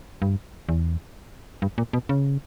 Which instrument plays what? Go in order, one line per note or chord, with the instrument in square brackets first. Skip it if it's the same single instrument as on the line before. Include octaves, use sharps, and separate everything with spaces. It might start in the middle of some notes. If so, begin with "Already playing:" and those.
[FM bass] G2
E2
G2
A#2
B2
C#3